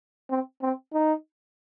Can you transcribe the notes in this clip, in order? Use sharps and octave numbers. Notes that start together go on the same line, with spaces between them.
C4
C4
D#4